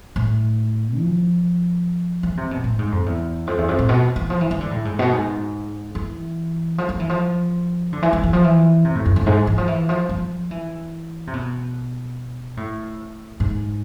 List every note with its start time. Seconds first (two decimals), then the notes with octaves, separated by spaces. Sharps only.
0.16 A2
1.00 F3
2.23 E3
2.37 C3
2.51 B2
2.64 A2
2.79 G#2
2.92 F2
3.06 E2
3.47 F2
3.58 E2
3.68 F2
3.79 A2
3.89 B2
4.16 E3
4.30 F3
4.41 E3
4.51 E3
4.61 D3
4.71 A2
4.85 G#2
4.99 B2
5.13 G#2
5.95 E3
6.78 F3
6.89 F3
7.00 E3
7.09 F3
7.93 D3
8.02 E3
8.13 F3
8.23 E3
8.33 F3
8.44 E3
8.85 C3
8.95 A2
9.06 F2
9.16 F2
9.26 G#2
9.47 E3
9.58 F3
9.68 E3
9.89 F3
10.09 F3
10.51 E3
11.27 C3
11.33 B2
12.57 A2
13.40 G#2